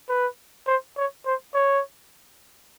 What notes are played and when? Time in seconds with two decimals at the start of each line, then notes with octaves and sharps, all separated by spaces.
0.09 B4
0.67 C5
0.97 C#5
1.26 C5
1.55 C#5